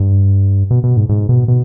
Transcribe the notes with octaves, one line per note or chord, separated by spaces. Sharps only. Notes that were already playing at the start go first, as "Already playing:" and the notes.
Already playing: G2
B2
B2
G#2
G#2
B2
B2